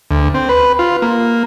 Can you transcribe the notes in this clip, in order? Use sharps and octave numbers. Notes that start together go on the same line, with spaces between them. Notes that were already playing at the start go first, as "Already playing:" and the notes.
D2
C4
B4
F4
A#3